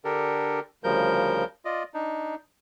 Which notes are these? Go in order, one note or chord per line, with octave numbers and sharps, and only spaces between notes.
D3 D4 G4 A4 A#4
D2 C#3 F3 G3 A#4 G6
F4 D5 D#5
D4 D#4